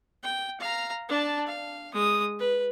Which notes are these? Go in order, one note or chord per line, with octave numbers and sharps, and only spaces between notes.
G5
F5 A#5
D4 A5
F5
G#3 D#6
B4